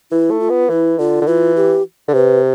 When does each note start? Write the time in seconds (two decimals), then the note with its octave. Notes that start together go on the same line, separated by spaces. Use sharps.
0.11 E3 E4
0.30 A3
0.40 F4
0.50 B3
0.69 E3 E4
0.98 D3 F4
1.21 D3
1.27 E3 F4
1.56 G4
2.08 D3
2.14 C3 B4